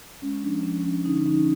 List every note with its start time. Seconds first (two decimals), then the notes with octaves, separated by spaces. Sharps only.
0.22 G#3 C#4
0.43 F3 D4
0.63 F3 C#4
0.84 F3 D4
1.05 D3 C#4 D#4
1.26 F3 C#4 D#4